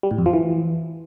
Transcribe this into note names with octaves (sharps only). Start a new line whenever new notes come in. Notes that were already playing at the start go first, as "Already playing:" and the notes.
G3
A2
F2
F3
E3